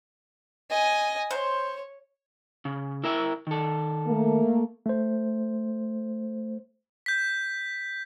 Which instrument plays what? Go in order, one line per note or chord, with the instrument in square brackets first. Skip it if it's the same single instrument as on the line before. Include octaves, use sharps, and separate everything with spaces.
[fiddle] D#5 G#5
[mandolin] C5 [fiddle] C#5
[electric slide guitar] C#3
E4 A#4 E5
D#3 A4
[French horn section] A3 A#3
[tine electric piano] A3 C5
[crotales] G6 B6